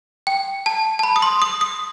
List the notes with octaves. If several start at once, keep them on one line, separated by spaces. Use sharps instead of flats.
G5
A5
A5
B5
D#6
C6
D#6
D#6